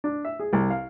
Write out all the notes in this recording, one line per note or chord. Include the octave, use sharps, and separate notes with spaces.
D4
E5
G#4
C2
F5